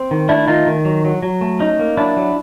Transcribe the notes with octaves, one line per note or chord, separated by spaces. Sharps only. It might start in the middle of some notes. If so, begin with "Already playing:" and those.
Already playing: C4
D#3
A3 D4 E4
D#3 D#4 F4
D#3
F#3
F#3
F#3
A3
C#4 D#4
A#3
F#3 D4 E4
F#3